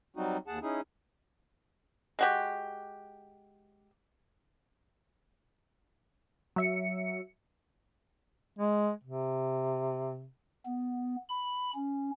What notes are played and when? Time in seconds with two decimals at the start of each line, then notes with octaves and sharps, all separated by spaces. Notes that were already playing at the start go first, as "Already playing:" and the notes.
0.16 F#3 G3 C4 D#4 F#4
0.47 D#2 G#4 F#5 A5
0.62 C#4 D#4 E4 G#4
2.19 G#3 F#4 G4
6.56 F#3 E5 C#7
8.59 G#3
9.04 C3
10.66 B3
11.29 B5
11.74 C#4